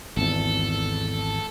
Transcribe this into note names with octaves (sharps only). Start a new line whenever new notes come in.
G#1 E2 A4